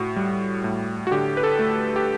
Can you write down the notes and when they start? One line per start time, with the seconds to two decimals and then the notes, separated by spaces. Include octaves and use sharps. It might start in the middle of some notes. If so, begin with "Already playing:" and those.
Already playing: A2 F#4
0.16 G3
0.64 A2
1.07 F#4
1.11 D3 G4
1.37 B4
1.43 A4
1.59 A3
1.96 G4